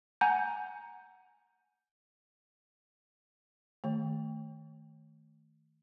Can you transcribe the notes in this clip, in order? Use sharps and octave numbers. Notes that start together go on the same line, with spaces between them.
F#5 G#5 A#5 G6
D#3 A3